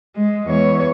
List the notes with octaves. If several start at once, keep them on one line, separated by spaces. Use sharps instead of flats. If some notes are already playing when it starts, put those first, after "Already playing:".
G#3
E2 C#5